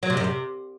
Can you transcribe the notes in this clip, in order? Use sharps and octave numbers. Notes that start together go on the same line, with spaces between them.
F#3
C3
F#2
C3